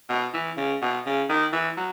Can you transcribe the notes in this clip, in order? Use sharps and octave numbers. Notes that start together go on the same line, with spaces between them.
B2
E3
C#3
B2
C#3
D#3
E3
F#3